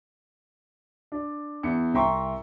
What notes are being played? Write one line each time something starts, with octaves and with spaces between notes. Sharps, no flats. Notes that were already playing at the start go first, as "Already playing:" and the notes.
D4
E2 C#7
C2 E5 G5 A#5 C6 C#6